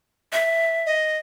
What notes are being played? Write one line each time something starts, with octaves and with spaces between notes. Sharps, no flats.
E5
D#5